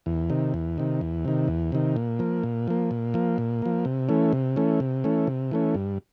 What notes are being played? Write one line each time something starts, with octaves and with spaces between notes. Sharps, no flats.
E2
C3 D#3
E2
C3 D#3
E2
C3 D#3
E2
C3 D#3
A#2
F3 A#3
A#2
F3 A#3
A#2
F3 A#3
A#2
F3 A#3
C3
E3 A3 C#4
C3
E3 A3 C#4
C3
E3 A3 C#4
C3
E3 A3 C#4
G2